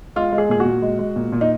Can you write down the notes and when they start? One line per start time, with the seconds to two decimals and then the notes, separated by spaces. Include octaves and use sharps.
0.16 G#3 F4
0.32 G#3
0.38 G#4
0.49 A#2 G#4
0.60 F#4
0.65 A#2
0.82 G#3
0.99 G#3
1.16 A#2
1.32 A#2
1.41 D#4